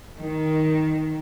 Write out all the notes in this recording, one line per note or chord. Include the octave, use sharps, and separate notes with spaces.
D#3